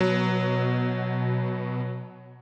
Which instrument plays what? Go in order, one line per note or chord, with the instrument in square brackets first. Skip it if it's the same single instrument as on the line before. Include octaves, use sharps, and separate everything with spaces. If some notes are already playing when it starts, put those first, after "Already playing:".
[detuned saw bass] B2 [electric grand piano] F#3